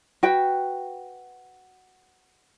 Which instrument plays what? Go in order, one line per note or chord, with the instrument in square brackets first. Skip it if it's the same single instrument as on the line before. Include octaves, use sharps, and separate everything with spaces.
[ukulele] F#4 B4 G5